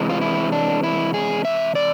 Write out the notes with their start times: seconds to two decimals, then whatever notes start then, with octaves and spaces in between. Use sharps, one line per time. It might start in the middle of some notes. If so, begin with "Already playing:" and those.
Already playing: C3 E3 G#3
0.10 F4
0.21 E4
0.52 D4
0.83 E4
1.14 G#4
1.45 E5
1.75 D5